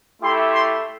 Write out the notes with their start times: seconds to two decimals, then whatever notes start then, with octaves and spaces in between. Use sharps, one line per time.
0.22 A3 E4 G4 C6
0.52 C6